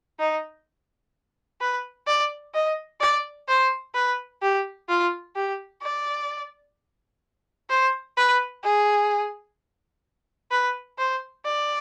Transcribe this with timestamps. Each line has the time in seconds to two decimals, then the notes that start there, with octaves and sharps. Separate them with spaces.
0.19 D#4
1.61 B4
2.07 D5
2.54 D#5
3.01 D5
3.48 C5
3.95 B4
4.42 G4
4.89 F4
5.36 G4
5.82 D5
7.70 C5
8.17 B4
8.64 G#4
10.51 B4
10.98 C5
11.45 D5